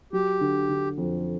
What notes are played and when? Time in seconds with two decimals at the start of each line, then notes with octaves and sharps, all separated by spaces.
0.13 F#3 G4
0.41 D3
0.69 D3
0.98 F2